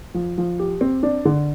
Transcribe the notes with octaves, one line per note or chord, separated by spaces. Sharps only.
F3
F3
G4
C4
D4
D3